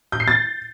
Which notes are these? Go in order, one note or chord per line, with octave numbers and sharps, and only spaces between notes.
G6
C7
A6